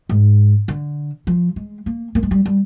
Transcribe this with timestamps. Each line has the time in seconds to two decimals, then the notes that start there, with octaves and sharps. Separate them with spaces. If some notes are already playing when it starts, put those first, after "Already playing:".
0.09 G#2
0.68 D3
1.27 F3
1.56 G#3
1.86 A#3
2.15 A#3
2.23 G#3
2.31 G3
2.45 G3